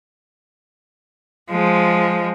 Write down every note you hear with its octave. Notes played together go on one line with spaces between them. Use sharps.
F3 G#3